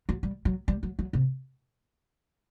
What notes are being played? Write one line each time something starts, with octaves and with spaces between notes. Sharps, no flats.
F#3
G3
F#3
G3
F#3
F#3
C3